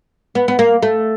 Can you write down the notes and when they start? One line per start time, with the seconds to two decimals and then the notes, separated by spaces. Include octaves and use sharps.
0.35 B3
0.48 B3
0.59 A#3
0.83 A3